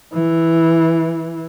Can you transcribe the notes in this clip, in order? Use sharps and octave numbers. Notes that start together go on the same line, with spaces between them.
E3